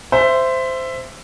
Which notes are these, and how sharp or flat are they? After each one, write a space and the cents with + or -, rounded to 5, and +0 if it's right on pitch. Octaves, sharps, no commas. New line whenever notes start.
C5 -10 E5 +15